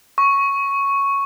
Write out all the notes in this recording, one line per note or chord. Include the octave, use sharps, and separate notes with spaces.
C#6